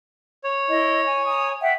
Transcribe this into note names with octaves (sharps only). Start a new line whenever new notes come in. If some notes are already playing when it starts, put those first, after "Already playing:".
C#5
E4 D#5
G#5
G#5 A#5 D#6
E5 F#5 G5